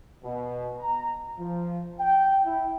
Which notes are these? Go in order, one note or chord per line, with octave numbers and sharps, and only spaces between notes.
B2
A#5
F3
G5
E4